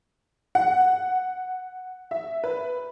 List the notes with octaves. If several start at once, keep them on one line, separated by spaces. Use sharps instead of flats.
F#5
E5
B4